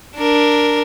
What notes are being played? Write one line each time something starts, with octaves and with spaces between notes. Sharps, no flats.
D4 A#4